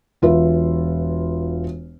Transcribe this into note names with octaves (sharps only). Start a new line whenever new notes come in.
E1 F4 B4 E5